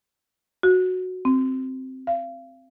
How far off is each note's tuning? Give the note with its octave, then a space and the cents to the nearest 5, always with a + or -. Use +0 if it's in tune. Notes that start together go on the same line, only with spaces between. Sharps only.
F#4 -5
C4 +0
F5 -35